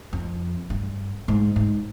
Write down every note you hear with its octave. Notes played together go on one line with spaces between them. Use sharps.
F2
G2
G#2
G#2